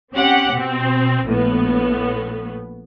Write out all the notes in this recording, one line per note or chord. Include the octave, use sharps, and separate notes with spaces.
C4 C#4 G4 F#5
B2 C4
A#1 A2 B3